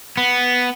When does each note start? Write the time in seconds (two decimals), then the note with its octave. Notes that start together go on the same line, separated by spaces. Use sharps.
0.17 B3